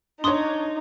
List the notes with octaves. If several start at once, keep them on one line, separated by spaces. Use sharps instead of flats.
D4 D#4 C#5 C6 D#6